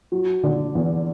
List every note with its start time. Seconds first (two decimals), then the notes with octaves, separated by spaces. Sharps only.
0.12 F#3
0.43 D3
0.75 E2